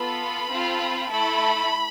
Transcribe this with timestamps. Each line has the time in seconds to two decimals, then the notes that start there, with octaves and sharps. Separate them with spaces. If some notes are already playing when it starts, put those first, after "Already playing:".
Already playing: B3 F4 A4 B5
0.51 C4 F4 A4
1.10 A3 E4 A4 B5